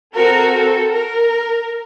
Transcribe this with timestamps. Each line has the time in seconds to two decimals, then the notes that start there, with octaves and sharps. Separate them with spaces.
0.14 C4 F#4 A4 A#4
0.54 A4
0.93 A#4